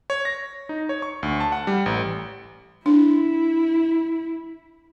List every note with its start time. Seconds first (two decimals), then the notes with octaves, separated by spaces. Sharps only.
0.10 C#5
0.25 A#6
0.69 D#4
0.89 C#5
1.02 C#6
1.23 D2
1.40 A5
1.52 F#5
1.67 G3
1.86 A1
2.86 D4 E4